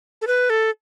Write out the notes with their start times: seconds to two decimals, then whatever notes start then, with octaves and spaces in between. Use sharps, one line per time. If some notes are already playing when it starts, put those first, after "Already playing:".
0.22 A4
0.27 B4
0.50 A4